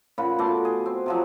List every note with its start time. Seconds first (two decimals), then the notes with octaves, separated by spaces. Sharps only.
0.18 A#2 C#3 F#5 B5
0.38 B2 A3 C6 D6
0.65 G#4
0.86 C4
1.06 C3 F3 F#3